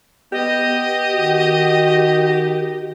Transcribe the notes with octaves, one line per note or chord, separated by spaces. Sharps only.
B3 G4 D#5
D#3 F#4